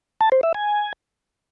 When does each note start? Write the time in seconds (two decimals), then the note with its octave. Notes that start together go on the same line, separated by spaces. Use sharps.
0.21 A5
0.32 C5
0.43 E5
0.54 G#5